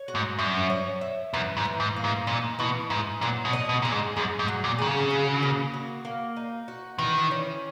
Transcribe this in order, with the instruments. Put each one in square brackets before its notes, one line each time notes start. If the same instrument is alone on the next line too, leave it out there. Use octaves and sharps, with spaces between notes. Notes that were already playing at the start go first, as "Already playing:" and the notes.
Already playing: [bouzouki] C#5
F#4
[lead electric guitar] G#2
[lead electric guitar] F#2 [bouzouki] E5
[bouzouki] C#5
E5
[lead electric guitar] F#2 [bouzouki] E3
[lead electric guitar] G#2
[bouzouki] E3
[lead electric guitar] G#2
[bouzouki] A#3
[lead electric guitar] G#2
[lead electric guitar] A#2 [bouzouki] D#4
[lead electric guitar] B2 [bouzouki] E3
[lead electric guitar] G#2 [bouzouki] E3
[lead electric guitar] A#2 [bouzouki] F#3
[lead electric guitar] B2
[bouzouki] D#5
[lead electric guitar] B2
[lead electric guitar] A#2 [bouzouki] G#4
[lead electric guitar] G#2
[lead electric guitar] F#2 [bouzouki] G#4
[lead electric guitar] G#2
[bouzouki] F#3
[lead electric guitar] A#2
[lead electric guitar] D#3 [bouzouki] G#4
[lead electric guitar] C#3
[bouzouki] F#4
A#3
F#4
A#3
D#4
F#4
[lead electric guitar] D#3 [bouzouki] E3
[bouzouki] C#4